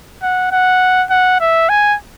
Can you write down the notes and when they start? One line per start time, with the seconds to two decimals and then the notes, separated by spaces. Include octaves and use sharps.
0.23 F#5
0.52 F#5
1.10 F#5
1.40 E5
1.69 G#5